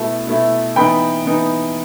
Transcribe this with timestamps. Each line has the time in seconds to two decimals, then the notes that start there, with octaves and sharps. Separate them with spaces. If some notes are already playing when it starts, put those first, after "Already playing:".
Already playing: B2 A3 E4 A5
0.27 B2 A3 E4
0.76 E3 B3 D#4 G5 B5
1.25 E3 B3 D#4